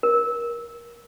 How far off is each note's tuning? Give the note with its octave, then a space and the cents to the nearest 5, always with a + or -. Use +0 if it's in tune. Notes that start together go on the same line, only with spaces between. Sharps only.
A#4 +20